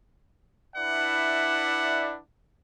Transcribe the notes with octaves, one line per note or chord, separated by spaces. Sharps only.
D4 E4 B4 D5 E5 F#5